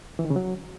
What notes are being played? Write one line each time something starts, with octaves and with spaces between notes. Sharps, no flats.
E3
D#3
C#3
F#3